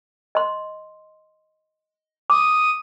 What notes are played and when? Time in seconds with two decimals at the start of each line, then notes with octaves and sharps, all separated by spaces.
0.35 D#5 C6
2.30 D6 D#6